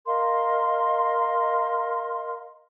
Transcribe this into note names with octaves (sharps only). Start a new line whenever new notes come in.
A#4 D#5 F5 C6